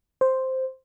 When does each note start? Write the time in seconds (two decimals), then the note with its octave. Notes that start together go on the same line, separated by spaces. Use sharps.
0.21 C5